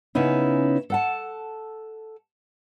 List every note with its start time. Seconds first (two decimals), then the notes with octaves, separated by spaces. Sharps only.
0.15 C#3 B3 C#4 D#4 E4
0.90 A4 F#5 A5